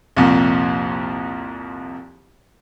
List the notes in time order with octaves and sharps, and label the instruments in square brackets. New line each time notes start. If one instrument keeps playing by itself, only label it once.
[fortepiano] C2 F2 A#2